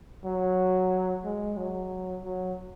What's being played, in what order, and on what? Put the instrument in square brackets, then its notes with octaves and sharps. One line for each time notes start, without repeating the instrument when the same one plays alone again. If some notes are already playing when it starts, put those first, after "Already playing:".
[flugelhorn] F#3
G#3
F#3
F#3